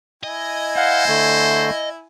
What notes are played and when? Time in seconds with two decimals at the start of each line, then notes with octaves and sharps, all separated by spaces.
0.24 E4 D#5 G#5
0.76 C5 F5 F#5
1.08 D3 A3